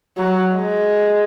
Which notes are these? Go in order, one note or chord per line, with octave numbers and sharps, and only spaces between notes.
F#3
G#3